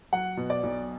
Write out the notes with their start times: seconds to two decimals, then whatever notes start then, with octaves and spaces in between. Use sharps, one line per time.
0.13 F#3 F#5
0.37 B2
0.50 D5
0.63 B1